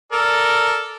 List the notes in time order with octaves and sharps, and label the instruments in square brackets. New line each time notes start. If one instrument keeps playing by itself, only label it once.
[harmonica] A4 A#4 D5